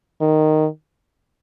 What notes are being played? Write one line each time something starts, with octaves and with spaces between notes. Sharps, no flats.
D#3